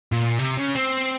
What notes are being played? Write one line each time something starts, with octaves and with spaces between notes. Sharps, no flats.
A#2
C3
C#3
C4